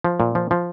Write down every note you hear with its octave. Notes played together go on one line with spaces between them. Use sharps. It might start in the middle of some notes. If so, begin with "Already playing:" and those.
F3
A#2
F3
F3